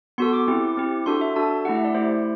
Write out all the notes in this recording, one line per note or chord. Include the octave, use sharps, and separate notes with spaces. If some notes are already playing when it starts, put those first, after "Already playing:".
B3 F#4 A4 C6
D6
C4 E4 G4
C4 E4 G4
D4 F#4 A4 C6
E5
D4 F#4 A4 A5
A3 E4 G4 F#5
E5
D5
A3 E4 G4 C5